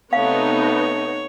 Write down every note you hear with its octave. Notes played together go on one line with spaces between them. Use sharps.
C3 A3 B3 D#4 C#5 F5